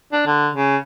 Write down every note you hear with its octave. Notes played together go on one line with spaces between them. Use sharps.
D4
D3
C#3